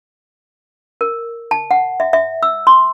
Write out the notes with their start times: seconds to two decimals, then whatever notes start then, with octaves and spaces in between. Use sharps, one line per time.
1.01 A#4
1.51 A5
1.71 F#5
2.00 E5
2.13 E5
2.43 E6
2.67 C6